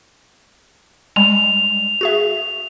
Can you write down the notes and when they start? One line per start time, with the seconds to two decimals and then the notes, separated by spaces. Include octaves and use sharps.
1.16 G3 G#3 F7
2.01 F#4 G#4 E5